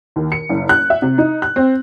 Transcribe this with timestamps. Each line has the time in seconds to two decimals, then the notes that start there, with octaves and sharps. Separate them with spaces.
0.16 D#2
0.32 C#7
0.49 F#1
0.69 F#6
0.90 E5
1.02 C3
1.18 D#4
1.42 F#6
1.56 C4